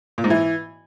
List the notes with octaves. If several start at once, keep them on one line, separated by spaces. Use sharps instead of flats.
A#2
G#2
E3